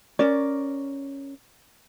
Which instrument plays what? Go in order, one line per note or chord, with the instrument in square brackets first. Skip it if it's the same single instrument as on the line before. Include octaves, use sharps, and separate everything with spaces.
[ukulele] C#4 A#4 D5